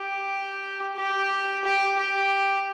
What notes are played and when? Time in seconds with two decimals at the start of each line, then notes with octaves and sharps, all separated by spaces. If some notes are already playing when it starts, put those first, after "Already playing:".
Already playing: G4
0.96 G4
1.64 G4
1.97 G4